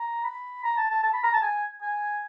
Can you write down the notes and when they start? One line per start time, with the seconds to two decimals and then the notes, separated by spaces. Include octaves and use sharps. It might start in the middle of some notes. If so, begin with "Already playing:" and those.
Already playing: A#5
0.24 B5
0.64 A#5
0.77 A5
0.90 A5
1.03 A5
1.13 B5
1.23 A#5
1.33 A5
1.43 G#5
1.82 G#5